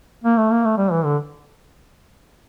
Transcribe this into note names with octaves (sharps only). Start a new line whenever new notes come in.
A#3
A3
A#3
A3
G3
E3
D3